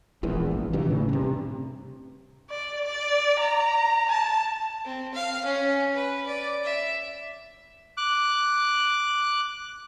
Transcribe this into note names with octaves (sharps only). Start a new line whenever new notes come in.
E1 A#1 E2 E3
G#1
G2 C3 D#3 E3
A2 C#3
G2 C3
D5
D5
A#5
A5
C4
F5
C#4
B4
D5
E5
D6 F#6